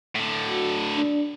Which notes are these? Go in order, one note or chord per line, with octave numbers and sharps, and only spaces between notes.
A2 D3
F#4
D4